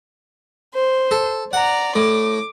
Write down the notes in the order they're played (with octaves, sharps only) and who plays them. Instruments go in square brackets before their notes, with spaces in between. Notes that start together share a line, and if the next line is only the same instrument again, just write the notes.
[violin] C5
[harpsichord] A4
[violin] D5 A#5 [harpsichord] F#5
[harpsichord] A2 [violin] D6